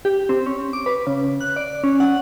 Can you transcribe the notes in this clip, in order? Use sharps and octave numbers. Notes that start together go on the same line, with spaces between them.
G4
C4
C#4
D6
B4
C#3
F#6
D5
C#4
F#5